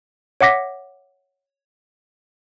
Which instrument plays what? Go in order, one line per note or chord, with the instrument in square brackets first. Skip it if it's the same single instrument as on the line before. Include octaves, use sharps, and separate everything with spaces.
[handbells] C#5 E5 F#5 D6 A#6 B6